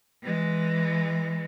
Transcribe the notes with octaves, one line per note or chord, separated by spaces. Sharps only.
E3 G#3